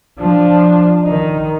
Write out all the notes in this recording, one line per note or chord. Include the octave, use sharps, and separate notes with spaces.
F3 D4
D#3 D#4